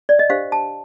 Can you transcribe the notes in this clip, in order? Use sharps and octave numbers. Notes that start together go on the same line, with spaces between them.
D5
D#5
D4 G4 C5 F5
A5